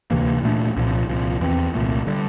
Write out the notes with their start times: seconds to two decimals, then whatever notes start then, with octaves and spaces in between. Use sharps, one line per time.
0.11 D2 C3 E3 A#3
0.43 A#2 A3 D4
0.76 C2 A#2 F3
1.09 C2 A#2 F3
1.41 E2 E3 G3 C4
1.74 C2 A#2 A3
2.07 D3 G3